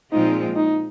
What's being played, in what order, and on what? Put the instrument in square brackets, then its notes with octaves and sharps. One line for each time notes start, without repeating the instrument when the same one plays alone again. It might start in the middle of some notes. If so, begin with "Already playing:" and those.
[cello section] A#2 F3 G#3 C4 F4 [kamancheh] D#4
[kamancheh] D#4